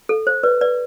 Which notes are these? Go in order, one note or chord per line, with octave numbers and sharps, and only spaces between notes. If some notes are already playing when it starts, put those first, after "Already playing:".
A4
C5
B4 D5
B4 D5